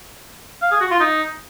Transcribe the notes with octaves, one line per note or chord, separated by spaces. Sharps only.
F5
G#4
F#4
F4
D#4